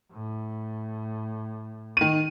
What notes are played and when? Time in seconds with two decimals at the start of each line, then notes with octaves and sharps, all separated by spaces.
0.12 A2
1.97 D#3 D#7